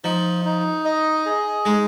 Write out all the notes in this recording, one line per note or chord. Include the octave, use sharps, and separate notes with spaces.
F3 D#4
D#4
D#5
G#4
G#3 D#4